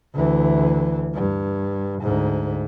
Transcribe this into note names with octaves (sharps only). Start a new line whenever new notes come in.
D2 E3
G2
D2 G#2